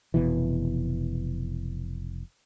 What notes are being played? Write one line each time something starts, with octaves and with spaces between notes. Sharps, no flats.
F1 B2 E3